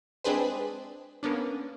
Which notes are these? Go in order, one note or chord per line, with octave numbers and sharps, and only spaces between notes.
G#3 C4 D4 G#4 B4 C5
A#3 B3 C#4 D4